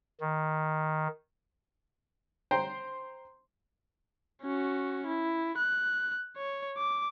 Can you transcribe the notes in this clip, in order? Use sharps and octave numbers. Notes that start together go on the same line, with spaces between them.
D#3
C5 G5 A#5 C6
C#4 F#4
E4
F#6
C#5
D6